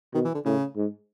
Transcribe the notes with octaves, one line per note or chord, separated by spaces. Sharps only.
B2 D#3
E3
D3
A2 C#3
G#2